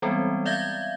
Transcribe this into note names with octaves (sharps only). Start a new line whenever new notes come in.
E3 G3 G#3 B3 C4
D5 E5 F5 G6 G#6 A#6